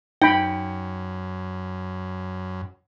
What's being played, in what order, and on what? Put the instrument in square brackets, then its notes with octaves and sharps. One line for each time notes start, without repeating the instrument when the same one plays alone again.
[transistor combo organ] F#2 [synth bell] D#4 [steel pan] G5 B5